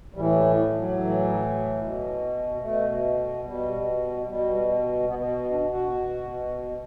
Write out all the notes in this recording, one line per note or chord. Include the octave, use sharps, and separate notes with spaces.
A2 E3 G3
G3
E3
F#3
A2 E3
B2
B2 A3
B2 G3
B2 G3
B2 B3
D4
F#4
B2